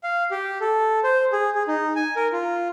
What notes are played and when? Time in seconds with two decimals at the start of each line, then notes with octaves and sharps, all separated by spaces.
0.03 F5
0.31 G4
0.61 A4
1.04 C5
1.33 G#4
1.55 G#4
1.68 D#4
1.96 G#5
2.16 A#4
2.32 F4